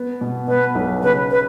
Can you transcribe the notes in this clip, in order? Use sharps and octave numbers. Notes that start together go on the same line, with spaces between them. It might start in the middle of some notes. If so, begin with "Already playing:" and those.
Already playing: B3
B2
B2 B4
B1
C#3 B4
B4